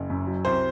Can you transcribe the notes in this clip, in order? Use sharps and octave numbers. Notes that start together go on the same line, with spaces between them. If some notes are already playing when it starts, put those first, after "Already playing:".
Already playing: F#1
F#2
F#3
C2 C5